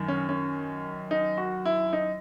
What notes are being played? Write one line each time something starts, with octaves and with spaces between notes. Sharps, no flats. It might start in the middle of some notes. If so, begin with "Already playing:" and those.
Already playing: F#2 D#3
C#4
C#4
D#4
F#4
E4
D#4